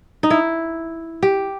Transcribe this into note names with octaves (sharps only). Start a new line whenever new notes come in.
D#4
E4
G4